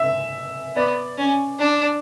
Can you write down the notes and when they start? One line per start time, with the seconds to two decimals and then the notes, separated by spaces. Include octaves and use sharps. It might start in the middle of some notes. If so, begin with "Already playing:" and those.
Already playing: E5
0.76 B3 D5
1.18 C#4
1.59 D4